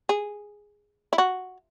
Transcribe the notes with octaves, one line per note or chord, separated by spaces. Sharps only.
G#4
E4
F#4